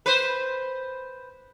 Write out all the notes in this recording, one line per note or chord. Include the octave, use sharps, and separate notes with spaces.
B4 C5